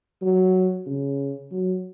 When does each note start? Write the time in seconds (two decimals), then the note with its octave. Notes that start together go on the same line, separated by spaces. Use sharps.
0.22 F#3
0.86 C#3
1.52 F#3